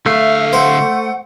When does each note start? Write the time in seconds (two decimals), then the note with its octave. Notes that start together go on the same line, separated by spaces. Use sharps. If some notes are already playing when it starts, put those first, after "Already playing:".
0.06 D2 A3 E5 F5
0.53 C5 F#5